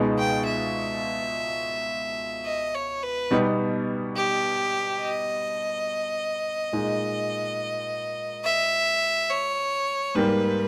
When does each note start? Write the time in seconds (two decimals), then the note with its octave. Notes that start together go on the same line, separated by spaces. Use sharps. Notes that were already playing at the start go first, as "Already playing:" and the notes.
Already playing: C#2 B2 G#3 B3 D#4
0.18 G5
0.46 E5
2.46 D#5
2.75 C#5
3.03 B4
3.31 B2 G3 B3 D#4
4.17 G4
5.01 D#5
6.73 A#2 G#3 D#4
8.43 E5
9.30 C#5
10.15 G#2 G3 A#3 B4